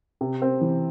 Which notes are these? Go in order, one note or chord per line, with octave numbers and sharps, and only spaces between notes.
C3
C4
E3